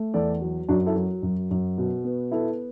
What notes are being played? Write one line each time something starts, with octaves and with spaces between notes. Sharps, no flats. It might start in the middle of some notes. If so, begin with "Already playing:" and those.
Already playing: A3
E2 A4 D5
F#3
F#2 D4 F#4
E4 A4
F#3
F#2
F#2
B2
B3
B3 E4 A4